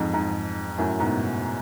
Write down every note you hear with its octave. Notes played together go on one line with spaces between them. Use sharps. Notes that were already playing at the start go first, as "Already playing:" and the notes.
Already playing: F2 G#2
F2 G#2
F#2 A2
G#2 B2